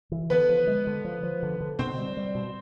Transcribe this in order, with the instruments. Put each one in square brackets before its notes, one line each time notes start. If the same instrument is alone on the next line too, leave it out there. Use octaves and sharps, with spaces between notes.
[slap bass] E3
[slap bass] D3 [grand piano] B3 B4
[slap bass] F3
G#3
D3
F3
F3
D3
D3
[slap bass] B2 [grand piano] C4 C5
[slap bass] G3
G3
B2